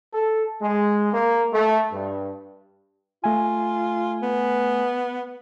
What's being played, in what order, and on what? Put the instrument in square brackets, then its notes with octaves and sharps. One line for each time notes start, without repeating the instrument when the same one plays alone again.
[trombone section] A4
G#3
A#3
A3
G2
[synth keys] A3 G#5 [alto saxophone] F4
[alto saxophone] B3